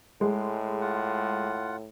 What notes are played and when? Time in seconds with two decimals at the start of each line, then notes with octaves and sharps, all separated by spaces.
0.21 A2 G#3
0.81 F4 F#5